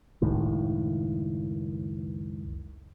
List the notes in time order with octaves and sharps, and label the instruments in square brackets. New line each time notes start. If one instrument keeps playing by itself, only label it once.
[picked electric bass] F#1 C#2 A2 D#3